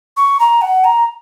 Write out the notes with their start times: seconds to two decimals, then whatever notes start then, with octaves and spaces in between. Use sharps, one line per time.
0.17 C#6
0.40 A#5
0.62 F#5
0.84 A#5